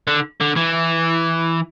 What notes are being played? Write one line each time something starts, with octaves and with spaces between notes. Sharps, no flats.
D3
D3
E3